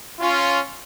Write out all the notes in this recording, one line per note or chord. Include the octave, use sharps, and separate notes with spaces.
C#4 F4